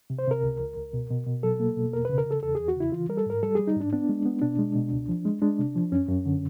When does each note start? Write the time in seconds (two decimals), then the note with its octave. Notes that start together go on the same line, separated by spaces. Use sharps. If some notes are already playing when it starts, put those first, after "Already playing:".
0.10 C3
0.19 C5
0.27 C3 A#4
0.44 C#2
0.60 C#2
0.76 C#2
0.93 B2
1.10 B2
1.27 B2
1.43 F#3 A4
1.60 A#3
1.76 B2
1.93 E2 A#4
2.05 C#3 B4
2.18 A#4
2.26 C#3 A4
2.43 E2 A4
2.55 E2 G#4
2.68 F#4
2.76 C#3 E4
2.92 E3 F4
3.09 G3 A#4
3.18 A4
3.26 G#2 A#4
3.43 G3 A4
3.55 G3 G#4
3.67 D#4
3.76 G#2 D4
3.93 B3 D4
4.09 G#3
4.25 B3
4.42 B2 D4
4.59 G#3
4.76 B2
4.92 C#2
5.09 F3
5.25 G#3
5.42 G#3 D4
5.59 C3
5.75 F3
5.92 F#2 C#4
6.09 F#2
6.26 D3